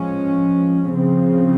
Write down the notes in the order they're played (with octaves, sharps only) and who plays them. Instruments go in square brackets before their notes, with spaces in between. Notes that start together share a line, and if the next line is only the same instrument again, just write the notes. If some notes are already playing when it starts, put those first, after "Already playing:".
Already playing: [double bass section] F3 G#3 C#4
C#3 F3 C4